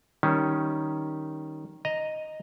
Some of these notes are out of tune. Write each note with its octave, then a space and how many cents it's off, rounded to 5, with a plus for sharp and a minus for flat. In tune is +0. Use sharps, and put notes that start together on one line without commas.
D#3 +0 G3 -10 C#4 +0
D#5 +0 A#5 +0